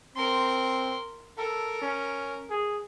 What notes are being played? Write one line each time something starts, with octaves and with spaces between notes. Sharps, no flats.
C4 A#4 C6
A4 A#4
C#4
G#4